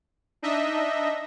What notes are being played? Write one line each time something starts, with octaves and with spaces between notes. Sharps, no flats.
D4 D#4 D#5 E5